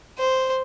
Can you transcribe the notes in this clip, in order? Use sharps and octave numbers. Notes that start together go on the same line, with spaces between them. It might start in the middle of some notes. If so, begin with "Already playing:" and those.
C5